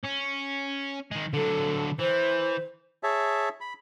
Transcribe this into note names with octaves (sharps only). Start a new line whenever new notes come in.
C#4
D#3 G#3
D3 F#3 A4
E3 C5
G#4 C#5 E5 A5
B5